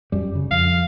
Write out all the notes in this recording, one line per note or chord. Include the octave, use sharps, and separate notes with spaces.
F#2 G3
C#3
F2 F5